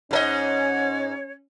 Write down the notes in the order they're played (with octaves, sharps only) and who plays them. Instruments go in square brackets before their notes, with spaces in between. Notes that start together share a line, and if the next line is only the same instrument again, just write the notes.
[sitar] G#2 A4 D#5 [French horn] C#4 [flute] C#5